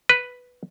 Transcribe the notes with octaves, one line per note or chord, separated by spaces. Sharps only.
B4